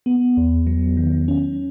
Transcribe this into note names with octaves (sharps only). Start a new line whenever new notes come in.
B3
E2
F#3
D#3
C#4